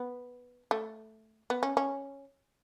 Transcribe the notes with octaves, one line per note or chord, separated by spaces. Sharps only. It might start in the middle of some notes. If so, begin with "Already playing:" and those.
Already playing: B3
A3
B3
C#4
C#4